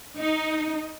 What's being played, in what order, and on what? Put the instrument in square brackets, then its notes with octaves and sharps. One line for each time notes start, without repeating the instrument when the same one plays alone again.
[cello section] D#4